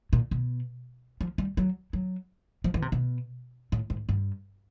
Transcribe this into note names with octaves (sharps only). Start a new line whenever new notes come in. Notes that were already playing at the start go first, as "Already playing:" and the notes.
A#2
B2
F3
G3
F#3
F#3
F3
E3
C3
B2
A2
G#2
G2